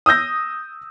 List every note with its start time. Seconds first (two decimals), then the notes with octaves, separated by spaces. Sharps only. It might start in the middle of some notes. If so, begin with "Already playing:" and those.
0.06 D#6 E6 G6 A#6